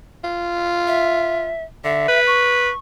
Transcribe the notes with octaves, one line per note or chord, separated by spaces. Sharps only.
F4
E5
D3 E5
B4
C#6